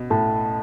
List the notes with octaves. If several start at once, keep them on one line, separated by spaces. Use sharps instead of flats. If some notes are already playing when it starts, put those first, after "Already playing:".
Already playing: B2
A2 A5